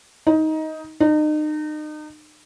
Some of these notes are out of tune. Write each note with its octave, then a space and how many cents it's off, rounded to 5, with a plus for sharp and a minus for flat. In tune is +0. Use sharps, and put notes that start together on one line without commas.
D#4 +15
D#4 -35